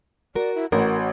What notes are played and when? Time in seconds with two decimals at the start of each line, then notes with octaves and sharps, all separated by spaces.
0.35 F#4 A#4 D5
0.55 E4
0.72 A1 F#4 A#4